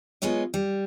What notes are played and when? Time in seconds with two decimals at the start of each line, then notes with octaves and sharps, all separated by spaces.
0.22 G#3 B3 F4 C#5 D#5
0.54 G3